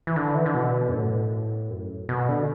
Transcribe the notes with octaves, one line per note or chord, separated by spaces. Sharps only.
E3
D3
E3
D3
B2
F#2
A2
F#2
B2
D3